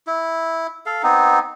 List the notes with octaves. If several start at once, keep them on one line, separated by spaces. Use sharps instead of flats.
E4
A4 F5
B3 C4 D#4